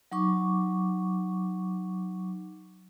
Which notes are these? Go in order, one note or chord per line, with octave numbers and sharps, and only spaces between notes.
F#3 D#4 C#6 D6